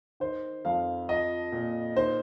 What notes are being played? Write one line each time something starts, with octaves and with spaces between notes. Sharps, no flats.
D#3 C5
F2 F5
F3 D#5
A#2
D#3 C5